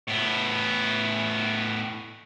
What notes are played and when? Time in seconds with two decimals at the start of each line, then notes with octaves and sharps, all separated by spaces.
0.08 A2 B3